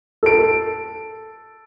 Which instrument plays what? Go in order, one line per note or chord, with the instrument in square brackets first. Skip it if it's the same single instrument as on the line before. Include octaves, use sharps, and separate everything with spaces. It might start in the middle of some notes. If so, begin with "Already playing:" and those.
[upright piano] A4 D7